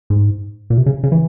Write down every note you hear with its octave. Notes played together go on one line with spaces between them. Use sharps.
G#2
A#2
C3
C#3
C#3
E3